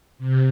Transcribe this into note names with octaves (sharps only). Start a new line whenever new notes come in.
C3